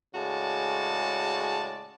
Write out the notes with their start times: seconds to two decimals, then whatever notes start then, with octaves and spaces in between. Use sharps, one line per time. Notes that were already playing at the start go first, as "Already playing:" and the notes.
0.14 A2 C#3 G#3 F#4 D5 A5